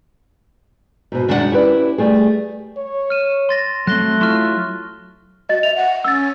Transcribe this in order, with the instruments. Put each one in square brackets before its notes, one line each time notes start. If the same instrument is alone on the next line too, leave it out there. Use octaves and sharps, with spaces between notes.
[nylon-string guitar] G#2 B2
F#2 D#3 G#3 D4 E4 F#5
C#4 E4 G4 B4 D5
G3 A3 G#4
[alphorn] C#5
[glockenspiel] F6 D#7 E7
C6 A6 A#6
[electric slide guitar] F#3 C4 [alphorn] A3 [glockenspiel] F#6 A#6 G7
[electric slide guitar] F#3 E4 F4 [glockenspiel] C6 C#6 F6
[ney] F#4 [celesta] D#5 A6
[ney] E5 [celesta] F7
[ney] F#5
[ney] C#4 [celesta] E6 A6